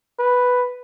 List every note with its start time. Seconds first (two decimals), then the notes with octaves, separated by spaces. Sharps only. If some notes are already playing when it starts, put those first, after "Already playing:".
0.19 B4